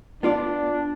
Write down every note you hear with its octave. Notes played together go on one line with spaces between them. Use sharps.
B3 D4 F4 D5